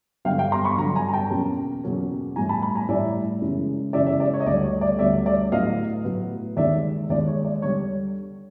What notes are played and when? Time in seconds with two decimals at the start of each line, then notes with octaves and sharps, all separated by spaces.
0.25 G2 D3 F#3 F5 G5
0.38 F5 G5
0.52 A#5 C6
0.65 B5 C#6
0.77 G2 D3 F#3 A#5 C6
0.96 G#5 A#5
1.09 A#5
1.13 G5 A5
1.30 E2 B2 F#3 A#3 C#4
1.84 E2 B2 F#3 A#3 C#4
2.36 A2 E3 G3 G#5 A#5
2.49 A5 B5
2.62 A5 B5
2.75 G#5 A#5
2.89 A2 E3 G3 D5 E5
3.41 F#2 C#3 E3 G#3
3.93 F#2 C#3 E3 G#3 D5 E5
4.06 D5 E5
4.20 D5
4.34 C#5
4.40 D#5
4.46 D2 D5
4.49 D3 G3
4.64 C#5
4.81 D5
4.99 D2 D3 G3 D5 E5
5.26 D5 E5
5.52 A2 F#3 B3 D#5 F5
6.04 A2 F#3 B3
6.57 D#2 D#3 G#3 D5 E5
7.09 D#2 D#3 G#3 D5
7.28 C#5
7.45 D5
7.62 D3 G3 C#5